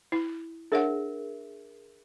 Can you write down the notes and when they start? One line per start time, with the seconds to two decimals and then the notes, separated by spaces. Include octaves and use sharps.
0.12 E4
0.72 D4 G#4 A#4 C#5 E5 F#5